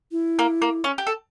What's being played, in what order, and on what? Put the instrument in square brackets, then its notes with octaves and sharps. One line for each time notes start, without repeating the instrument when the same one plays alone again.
[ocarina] E4
[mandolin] A#3
A#3
C#4
G4
A4